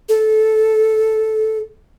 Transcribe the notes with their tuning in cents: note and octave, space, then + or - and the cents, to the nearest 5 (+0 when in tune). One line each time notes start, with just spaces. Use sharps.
A4 -10